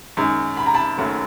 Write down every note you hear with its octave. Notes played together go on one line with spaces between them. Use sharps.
F#2 D#3 G#3
B5
A#5
A5 B5
F#1 F#2 D#3 F#3 A3